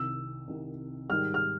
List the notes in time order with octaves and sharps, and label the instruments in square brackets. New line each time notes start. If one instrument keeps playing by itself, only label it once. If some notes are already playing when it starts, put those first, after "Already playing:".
Already playing: [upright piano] C2 C3 D#3 [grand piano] E6
[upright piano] C2 C3 D#3
[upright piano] G#2 D#3 G3 [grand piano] F6
[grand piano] F6